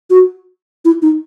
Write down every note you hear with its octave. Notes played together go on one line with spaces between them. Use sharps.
F#4
E4
D#4